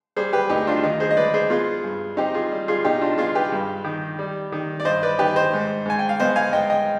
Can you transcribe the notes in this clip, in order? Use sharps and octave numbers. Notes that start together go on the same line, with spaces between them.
G3 G#4 C5
G4 B4
D2 D#4 G4
D4 F4
D#3 D#4
G#4 C5
D#5
G#3 B4 D5
G#4 C5
B3 F4 G#4
G2
C4 D#4 G4
F4 G#4
G3
F4 G#4
B2 D#4 G4
D4 F4
B3 F4 G#4
G4 B4
G2
D#3
G3
D#3
D5
G2 C5 D#5
B4 D5
D#3 G4 B4
C5 D#5
G#2
G#2 G#5
G5
F5
B3 C5 D#5
F5 G#5
G#2 D#5 G5
D#5 G5